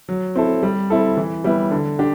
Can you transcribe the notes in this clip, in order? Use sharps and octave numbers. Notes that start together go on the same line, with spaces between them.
F#3
C4 E4 A4
G3
C4 E4 A4
E3
G3 B3 E4
D3
D4 G4